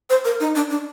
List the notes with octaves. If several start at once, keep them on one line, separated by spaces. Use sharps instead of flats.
C5
A#4
D#4
D4
D4